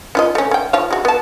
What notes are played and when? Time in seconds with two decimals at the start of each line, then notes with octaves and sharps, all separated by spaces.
0.15 C#4 F4 D#5
0.35 A3 C#4
0.51 C#4 G5
0.73 F3 C#5 F5
0.91 G#3 F#4
1.05 B3 A5